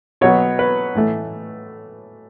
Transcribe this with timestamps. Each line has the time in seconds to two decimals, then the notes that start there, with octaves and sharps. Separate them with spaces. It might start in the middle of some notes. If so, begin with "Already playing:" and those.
0.21 B2 F#3 B3 C#5
0.59 B4
0.95 A2 E3 A3